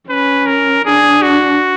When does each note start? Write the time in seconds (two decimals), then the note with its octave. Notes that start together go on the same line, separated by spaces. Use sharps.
0.09 C#4 B4
0.46 A#4
0.85 D4 G#4
1.22 F#4